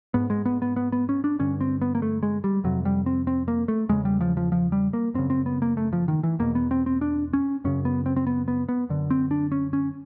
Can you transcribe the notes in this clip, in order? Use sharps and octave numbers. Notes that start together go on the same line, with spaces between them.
G#2 B3
G#3
B3
B3
B3
B3
C#4
D4
G2 D3 C#4
C4
B3
A#3
A3
G#3
G3
F2 C3 F#3
G3
C4
C4
A#3
A3
E2 C#3 G#3
G3
F3
F3
F3
G3
A#3
F#2 C#3 C4
C4
B3
A#3
A3
F3
D#3
E3
E2 B2 A#3
B3
C4
C4
D4
C#4
F#2 C#3 C#4
B3
C4
C4
B3
B3
B3
F#2 D3
C4
D4
C#4
C#4